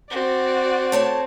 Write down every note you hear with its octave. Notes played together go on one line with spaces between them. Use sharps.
C4 F#4 D5
A3 C#5 A5